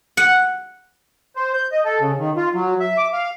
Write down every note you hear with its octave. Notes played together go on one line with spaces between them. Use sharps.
F#5
C5
G6
D#5
A4
C#3
D#3
F4
F#3
E5
D6
F5